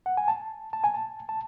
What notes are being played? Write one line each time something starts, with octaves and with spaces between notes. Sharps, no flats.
F#5
G#5
A5
A5
G#5
A5
A5